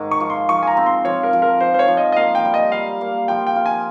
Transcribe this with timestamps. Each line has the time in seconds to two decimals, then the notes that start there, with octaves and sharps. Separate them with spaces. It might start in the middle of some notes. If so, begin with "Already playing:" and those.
Already playing: G#2 D#3
0.11 C#6
0.20 F3
0.30 C6
0.49 F3 C#6
0.63 G#5
0.67 A#5
0.77 C4
0.86 C6
1.05 F3 C#5
1.23 A#4
1.33 F3
1.42 A#4
1.60 F3 C5
1.74 C5
1.79 C#5
1.88 F3
1.97 D#5
2.12 D#5
2.17 A#3 F5
2.35 G5
2.45 G3
2.54 D#5
2.72 G3 F5
3.01 A#3
3.28 F3 G5
3.47 G5
3.56 F4
3.66 G#5